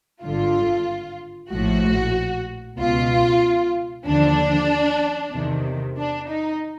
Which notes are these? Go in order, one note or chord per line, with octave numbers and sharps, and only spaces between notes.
G#1 G2 D3 F4
A#1 A2 F3 F#4
C#2 B2 F4
D#2 D3 F3 D4
E2 C3 D#3
D4
D#4